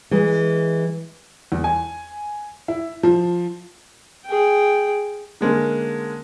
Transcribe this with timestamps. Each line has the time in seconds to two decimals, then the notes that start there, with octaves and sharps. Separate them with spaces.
0.11 E3 G#3
1.52 E2
1.64 G#5
2.68 E4
3.03 F3
4.26 G#4 G5
5.41 D3 G#3 A#3 C#4